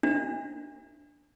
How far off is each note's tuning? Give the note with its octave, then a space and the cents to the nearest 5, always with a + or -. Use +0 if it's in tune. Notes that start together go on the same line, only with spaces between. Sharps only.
D4 -10